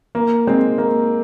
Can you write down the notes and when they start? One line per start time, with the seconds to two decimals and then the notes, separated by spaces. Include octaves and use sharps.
0.15 A#3
0.47 G#3 C4
0.78 A#3